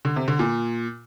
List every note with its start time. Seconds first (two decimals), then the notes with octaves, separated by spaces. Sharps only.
0.05 D3
0.16 C3
0.28 D3
0.39 A#2